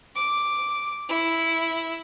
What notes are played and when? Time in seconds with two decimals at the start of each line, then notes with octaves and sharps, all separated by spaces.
0.15 D6
1.09 E4